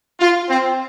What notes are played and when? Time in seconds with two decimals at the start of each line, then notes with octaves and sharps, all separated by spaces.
0.20 F4
0.49 C4